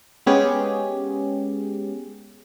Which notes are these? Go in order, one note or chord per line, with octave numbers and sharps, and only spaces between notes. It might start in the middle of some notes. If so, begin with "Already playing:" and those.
G#3 B3 C#4 G4 G#4